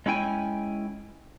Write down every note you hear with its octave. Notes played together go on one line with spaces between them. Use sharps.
G#3 C#4 E4 G5 G#5